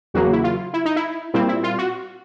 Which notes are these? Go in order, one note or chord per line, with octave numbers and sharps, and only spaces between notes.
E2 C#3 F#3 A#3 F#4
E4
F4
E4
D#4
E4
A#2 G3 C4 E4
E4
F4
F#4